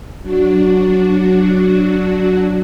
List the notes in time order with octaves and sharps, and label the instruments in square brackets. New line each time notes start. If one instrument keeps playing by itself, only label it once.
[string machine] F#3 D4 F#4